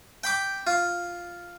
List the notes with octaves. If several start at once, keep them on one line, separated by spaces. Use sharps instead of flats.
G5 B5 D6
F4